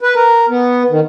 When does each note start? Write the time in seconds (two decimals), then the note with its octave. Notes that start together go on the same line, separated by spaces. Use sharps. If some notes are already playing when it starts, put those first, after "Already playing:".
0.01 B4
0.15 A#4
0.49 B3
0.90 D#3